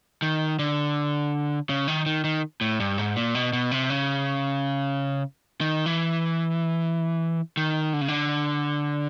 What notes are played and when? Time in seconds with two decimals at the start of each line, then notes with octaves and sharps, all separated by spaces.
0.22 D#3
0.59 D3
1.69 C#3
1.88 D#3
2.06 D#3
2.24 D#3
2.61 A2
2.80 G2
2.98 G#2
3.16 A#2
3.35 B2
3.53 B2
3.71 C3
3.90 C#3
5.61 D#3
5.86 E3
7.57 D#3
7.93 D3
8.01 C#3
8.08 D3